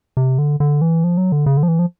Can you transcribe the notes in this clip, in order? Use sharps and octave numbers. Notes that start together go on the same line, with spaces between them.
C3
D3
D3
E3
F3
F#3
D3
C#3
D3
F3
E3
F3